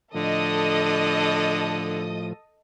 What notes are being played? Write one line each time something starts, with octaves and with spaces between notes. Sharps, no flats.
A2 D3 F3 A4 D#5 D#6